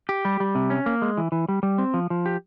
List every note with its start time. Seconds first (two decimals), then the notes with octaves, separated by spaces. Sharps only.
0.09 G4
0.25 G3
0.40 G3
0.55 C3
0.70 C#4
0.86 A#3
1.02 G#3
1.17 E3
1.32 E3
1.49 G3
1.63 G3
1.78 C4
1.94 F3
2.10 F3
2.26 G4